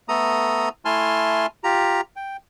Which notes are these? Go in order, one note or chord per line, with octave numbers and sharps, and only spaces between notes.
A3 B3 A4 A#5 D#6
A3 E4 G#5 A5 C6 F6
F4 G4 A#5
G5